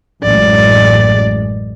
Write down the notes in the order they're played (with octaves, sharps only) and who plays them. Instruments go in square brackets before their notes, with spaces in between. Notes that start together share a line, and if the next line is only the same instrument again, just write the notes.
[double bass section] A1 F#2 G#3 [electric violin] D5